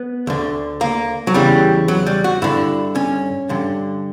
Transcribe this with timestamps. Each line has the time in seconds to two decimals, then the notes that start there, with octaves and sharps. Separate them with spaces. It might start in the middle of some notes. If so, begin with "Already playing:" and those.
Already playing: B3
0.27 D2 D3
0.81 A#3
1.27 F#3
1.34 E2 C#3 E3 G3
1.88 F#3
2.06 G3
2.24 F#4
2.42 G2 D3 E4
2.95 C#4
3.49 G2 D3